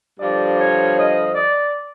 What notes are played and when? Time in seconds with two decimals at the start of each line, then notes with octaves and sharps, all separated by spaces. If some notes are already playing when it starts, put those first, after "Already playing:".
0.17 G2 D3 F3 D5
0.57 C#5
0.95 D#5
1.33 D5